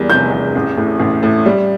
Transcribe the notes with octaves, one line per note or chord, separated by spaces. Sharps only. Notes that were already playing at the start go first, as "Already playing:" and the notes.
Already playing: E2 G3 A#3
F1 G6
E2
A1
A2
A1
A2
G3